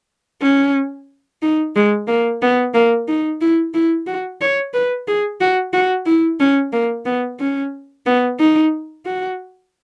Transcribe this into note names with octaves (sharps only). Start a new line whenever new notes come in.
C#4
D#4
G#3
A#3
B3
A#3
D#4
E4
E4
F#4
C#5
B4
G#4
F#4
F#4
E4
C#4
A#3
B3
C#4
B3
D#4
F#4